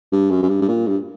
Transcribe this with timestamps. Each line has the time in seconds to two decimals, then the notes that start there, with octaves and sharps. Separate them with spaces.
0.12 G2
0.30 F#2
0.42 F#2
0.48 G2
0.61 G2
0.68 A#2
0.87 G2